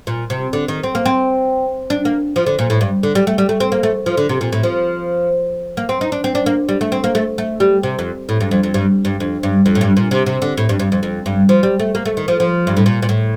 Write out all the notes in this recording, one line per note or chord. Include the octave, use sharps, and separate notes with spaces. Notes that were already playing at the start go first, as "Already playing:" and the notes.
A#2
C3
D3
D#3
C4
A#3
C4
D4
A#3
F3
D3
A#2
A2
G2
D3
G3
A3
G3
A3
C4
A#3
A3
F3
D3
C3
A#2
A2
F3
A#3
C4
D#4
D4
C4
D4
A#3
G3
A3
C4
A#3
A3
A3
G3
C3
F2
A2
G2
F2
F2
G2
G2
F2
G2
F2
A2
G2
A#2
C3
C3
D3
A2
G2
G2
F2
F2
G2
F3
G3
A3
A#3
A3
D#3
F3
F3
G2
A2
A#2
A#2
A2